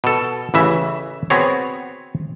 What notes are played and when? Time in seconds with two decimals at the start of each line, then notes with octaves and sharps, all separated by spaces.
0.04 B2 A4
0.54 A1 C#3 E3 E5
1.30 B3 C4 F#4 G#4 C#5